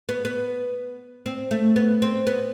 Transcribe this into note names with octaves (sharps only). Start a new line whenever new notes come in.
B3
B3
C4
A3
B3
C4
B3